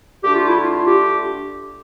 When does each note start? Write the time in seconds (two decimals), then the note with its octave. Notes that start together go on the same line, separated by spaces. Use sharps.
0.23 D3 A3 D4 G4
0.36 F4
0.47 E4
0.59 F4
0.86 G4